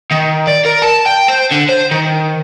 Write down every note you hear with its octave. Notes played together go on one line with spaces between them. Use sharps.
D#3
D5
A#4
A5
G5
C5
D3
C5
D#3